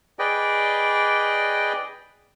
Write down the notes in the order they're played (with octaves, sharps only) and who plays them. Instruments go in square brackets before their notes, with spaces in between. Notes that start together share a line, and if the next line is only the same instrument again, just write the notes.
[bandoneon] G#4 B4 D5 D#5 G5